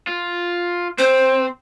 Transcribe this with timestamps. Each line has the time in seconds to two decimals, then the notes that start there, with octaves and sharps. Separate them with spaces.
0.07 F4
0.98 C4 C5